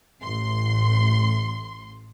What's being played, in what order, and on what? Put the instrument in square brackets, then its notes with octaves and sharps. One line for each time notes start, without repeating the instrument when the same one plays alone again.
[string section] A1 C6